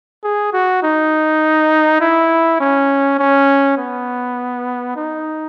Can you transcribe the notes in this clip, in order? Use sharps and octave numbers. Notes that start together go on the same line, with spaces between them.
G#4
F#4
D#4
E4
C#4
C#4
B3
D#4